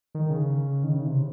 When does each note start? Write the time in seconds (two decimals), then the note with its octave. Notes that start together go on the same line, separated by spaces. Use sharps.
0.15 D#3
0.30 C#3
0.83 D#3
0.94 C#3
1.06 C3